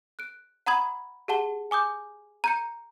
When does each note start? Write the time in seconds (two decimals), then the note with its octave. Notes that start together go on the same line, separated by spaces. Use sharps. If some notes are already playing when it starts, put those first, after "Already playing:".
0.19 F#6 D7
0.66 F#5 A#5 B5 D#6 G#6 F#7
1.28 G4 G#4 F#5 A5 G7
1.71 G#5 D6 D#6 G6
2.44 A#5 G6 C#7